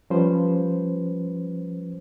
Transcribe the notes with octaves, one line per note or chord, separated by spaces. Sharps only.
F3 G3 C#4 B4 C5